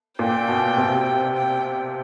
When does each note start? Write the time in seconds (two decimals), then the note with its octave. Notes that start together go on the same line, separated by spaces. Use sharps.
0.18 A#2 G5
0.48 B2
0.77 C3
1.36 G5